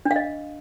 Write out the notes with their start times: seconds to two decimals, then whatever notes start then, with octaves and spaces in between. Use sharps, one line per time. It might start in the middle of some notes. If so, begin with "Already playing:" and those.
0.05 D4
0.11 F5
0.16 D#5